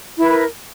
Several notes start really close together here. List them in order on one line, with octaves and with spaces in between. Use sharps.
E4 B4 A#4